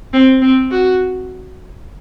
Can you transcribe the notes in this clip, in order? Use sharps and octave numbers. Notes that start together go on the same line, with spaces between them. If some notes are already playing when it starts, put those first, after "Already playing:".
C4
C4
F#4